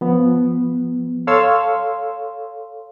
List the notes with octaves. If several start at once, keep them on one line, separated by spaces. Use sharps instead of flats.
F3 B3
A4 C#5 F5 C6 E6